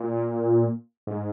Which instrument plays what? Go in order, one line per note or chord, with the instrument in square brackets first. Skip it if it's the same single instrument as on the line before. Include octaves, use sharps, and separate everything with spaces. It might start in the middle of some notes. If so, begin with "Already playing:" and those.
Already playing: [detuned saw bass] A#2
G#2